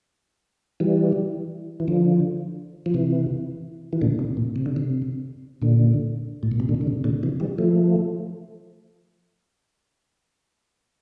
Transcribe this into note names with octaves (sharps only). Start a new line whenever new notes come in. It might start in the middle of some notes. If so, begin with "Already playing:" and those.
E3 G3
E3
D3 F3
F3
C3 E3
E3
A#2 D3
C3
A#2
C3
D3
C3
A#2 D3
A2
A#2
C3
A#2 D3
D3
C3
A#2 D3
C3 E3
E3 G3
F3 A3